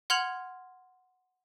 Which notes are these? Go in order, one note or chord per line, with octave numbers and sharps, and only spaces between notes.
F#5 C6 F6 G#6 F7 F#7